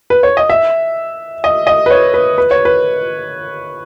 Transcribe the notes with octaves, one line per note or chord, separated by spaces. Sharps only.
B4
C#5
D#5
E5
D#5
D#5
B4
C#5
B4
B4
C#5
B4